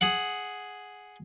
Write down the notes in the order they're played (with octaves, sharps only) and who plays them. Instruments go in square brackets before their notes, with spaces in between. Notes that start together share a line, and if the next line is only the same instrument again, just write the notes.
[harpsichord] G#4 F#5